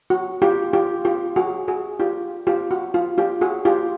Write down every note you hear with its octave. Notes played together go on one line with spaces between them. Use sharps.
F#4
F4 G4
F4 G4
F4 G4
F#4 G#4
F#4 G#4
F4 G4
F4 G4
F#4
F4
F4 G4
F#4 G#4
F4 G4